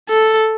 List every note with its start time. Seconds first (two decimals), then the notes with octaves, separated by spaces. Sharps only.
0.10 A4